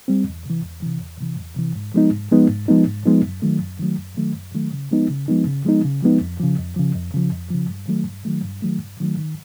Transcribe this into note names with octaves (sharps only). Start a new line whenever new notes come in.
G3 C4
E2
C3 E3
E2
C3 E3
E2
C3 E3
E2
C3 E3
G#2
F3 G#3 B3 D#4
G#2
F3 G#3 B3 D#4
G#2
F3 G#3 B3 D#4
G#2
F3 G#3 B3 D#4
F#2
D#3 F#3 A3
F#2
D#3 F#3 A3
F#2
D#3 F#3 A3
F#2
D#3 F#3 A3
C#3
F3 G#3 B3 D#4
C#3
F3 G#3 B3 D#4
C#3
F3 G#3 B3 D#4
C#3
F3 G#3 B3 D#4
F2
C#3 F3
F2
C#3 F3
F2
C#3 F3
F2
C#3 F3
G2
D#3 F#3 A3
G2
D#3 F#3 A3
G2
D#3 F#3 A3
G2
D#3 F#3 A3
D#3